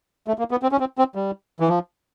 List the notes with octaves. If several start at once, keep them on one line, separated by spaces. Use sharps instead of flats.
A3
A#3
B3
C4
C#4
C4
C4
G3
E3
F3